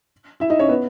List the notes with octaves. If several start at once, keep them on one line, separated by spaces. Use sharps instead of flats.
E4 E5
D#4 D#5
C#4 C#5
B3 B4